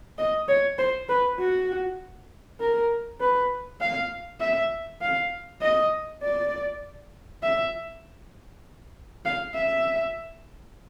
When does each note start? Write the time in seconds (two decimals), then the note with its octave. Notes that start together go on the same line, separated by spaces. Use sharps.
0.18 D#5
0.48 C#5
0.78 C5
1.09 B4
1.39 F#4
2.60 A#4
3.21 B4
3.81 F5
4.41 E5
5.01 F5
5.62 D#5
6.23 D5
7.43 E5
9.25 F5
9.55 E5